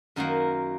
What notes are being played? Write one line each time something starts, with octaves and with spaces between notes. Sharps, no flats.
F#2 D#3 F#3 A#3 A#4